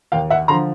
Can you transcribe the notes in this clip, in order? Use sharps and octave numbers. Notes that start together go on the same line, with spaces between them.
D#2 F5 G5
E5 F#5
D3 F3 A#5 C6